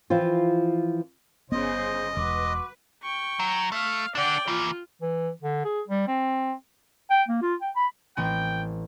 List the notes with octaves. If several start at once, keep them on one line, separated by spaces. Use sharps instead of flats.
E3 F3 C4 F4
G1 C#3 B3 C5 D#5
E1 F#4 B4 C6 D6
G5 C#6
F#3
A3 F5
D4 D5 F#5 G5
E3 A#3 F4
E3
D3
G#4
G3
C4
G5
A#3
F4
G5
B5
A1 C4 G5 G#5